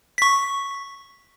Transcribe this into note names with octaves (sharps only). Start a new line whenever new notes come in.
C#6 B6